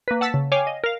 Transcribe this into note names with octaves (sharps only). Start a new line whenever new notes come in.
A#3 B4
F#5 A5 E6 A6 B6
C#3
C#5 F5 G5 G#5 D6
D#5
A#4 F5